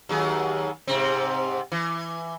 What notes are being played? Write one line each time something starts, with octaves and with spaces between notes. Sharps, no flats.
D#2 F#3 G#4
G#2 C3 C4
E3